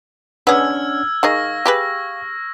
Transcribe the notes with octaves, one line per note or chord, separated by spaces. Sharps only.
B3 C#4 D4 G#4 F#5 E6 F6 G#6
D#3 G#4 D#5 F5 C#6 A#6
G4 G#4 B4